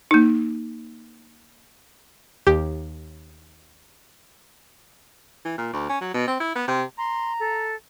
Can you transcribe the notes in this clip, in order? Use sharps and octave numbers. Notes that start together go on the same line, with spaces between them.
A#3 D#4
D#2 G4
E3
A#2
D2
C#4
F#3
B2
C4
E4
B3
C3
A#5 C6
A4